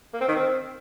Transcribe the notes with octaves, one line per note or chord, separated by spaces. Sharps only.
A#3
C4
D#3
C4